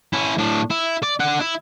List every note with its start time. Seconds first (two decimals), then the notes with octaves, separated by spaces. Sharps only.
0.13 C#4 E4
0.38 A2 D4
0.70 E4
1.03 D5
1.20 D4 F#5
1.40 E4